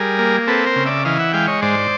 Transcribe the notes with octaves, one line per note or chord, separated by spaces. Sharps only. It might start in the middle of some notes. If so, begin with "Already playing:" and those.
Already playing: G3 G#4 A#4
A#3
C4 A4 B4
A#4 C5
C#3
D5 E5
E3 D#5 F5
E5 F#5
G#3 F5 G5
C#5 D#5
G#2 C5 D5